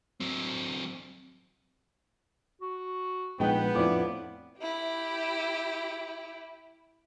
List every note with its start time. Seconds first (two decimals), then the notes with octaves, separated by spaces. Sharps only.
0.20 F#3 C4
2.62 F#4
3.40 A#1 G#3 B3 D#4 B4 G5
3.75 F2 A2 F3 D4 E4 D6
4.59 E4 G4